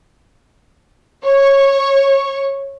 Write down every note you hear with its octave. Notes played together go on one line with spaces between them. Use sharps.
C#5 C#6